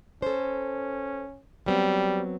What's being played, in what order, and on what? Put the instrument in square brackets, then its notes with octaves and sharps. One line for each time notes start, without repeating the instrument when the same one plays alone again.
[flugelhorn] C#4 [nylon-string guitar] A4 C5
[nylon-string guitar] F#3 B3 C4 [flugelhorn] G3